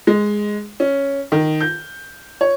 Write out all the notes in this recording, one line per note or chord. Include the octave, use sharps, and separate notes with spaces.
G#3
C#4
D#3
G6
C#5